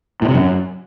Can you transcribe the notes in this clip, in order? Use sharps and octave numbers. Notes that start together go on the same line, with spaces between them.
A2
C3
F#2